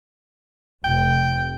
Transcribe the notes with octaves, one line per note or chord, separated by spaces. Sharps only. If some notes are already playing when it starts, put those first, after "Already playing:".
F1 G5